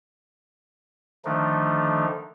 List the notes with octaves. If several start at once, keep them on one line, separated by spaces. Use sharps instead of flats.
D3 D#3 F3 A3 D4 D#4